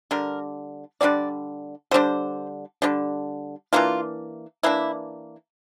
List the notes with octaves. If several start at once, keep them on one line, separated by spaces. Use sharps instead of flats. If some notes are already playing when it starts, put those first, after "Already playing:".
D3 G3 D4 A#4
D3 G3 D4 D5
D3 G3 D4 C5
D3 G3 D4
E3 A#3 D4 F4
E3 A#3 D4 E4